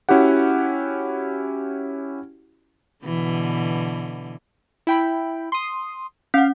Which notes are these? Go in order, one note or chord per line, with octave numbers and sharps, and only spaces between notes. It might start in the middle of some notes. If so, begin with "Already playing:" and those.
C#4 E4 F#4 G4 F#5
B2 D3 E3
E4 G5 B5
C6 D#6
C#4 F5 F#5